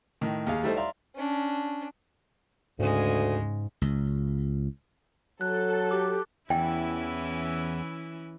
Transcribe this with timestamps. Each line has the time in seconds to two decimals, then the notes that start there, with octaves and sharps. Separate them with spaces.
0.21 A2 D#3
0.47 D#2 G#4 F5
0.63 G3 A3 D#4 E4 A4 C5
0.76 D5 E5 F5 A#5 C6
1.15 C#4 D4
2.79 D2 G#2 C#3 G#3
3.82 C#2
5.41 F#3 A4 F#6
5.91 G4 D6
6.50 E2 E3 C#4 E4 G5